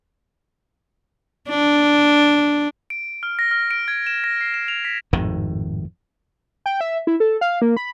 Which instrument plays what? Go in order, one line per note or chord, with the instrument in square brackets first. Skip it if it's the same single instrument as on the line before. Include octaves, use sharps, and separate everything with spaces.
[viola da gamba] D4
[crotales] D7
F6
A#6
F6
D7
G#6
E7
A#6
C7
E7
F7
B6
[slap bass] G#1 F2 A2 D#3
[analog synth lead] G5
E5
E4
A4
F5
A#3
B5